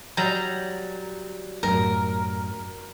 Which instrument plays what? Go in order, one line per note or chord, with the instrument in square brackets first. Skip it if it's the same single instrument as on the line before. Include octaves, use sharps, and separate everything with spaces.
[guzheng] F#3 G3 A#5
[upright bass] F#2 A2 [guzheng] A#4